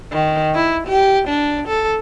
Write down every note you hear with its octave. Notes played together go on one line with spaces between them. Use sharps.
D#3
E4
G4
D4
A4